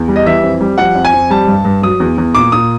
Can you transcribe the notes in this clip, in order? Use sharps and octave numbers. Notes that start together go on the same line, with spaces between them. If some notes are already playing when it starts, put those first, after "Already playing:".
Already playing: E2
G3
D#5
E3 E5
F2
G3
F3 F#5
F2
G#5
F2
G3 A5
G2
G2
F#3 D#6
E2
E2
A#2 D6
A#2 D#6